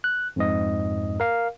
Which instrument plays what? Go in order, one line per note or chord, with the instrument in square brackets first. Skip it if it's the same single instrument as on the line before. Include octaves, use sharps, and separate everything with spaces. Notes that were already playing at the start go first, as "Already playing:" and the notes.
[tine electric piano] F#6
F2 G#2 D#5
A#4 F5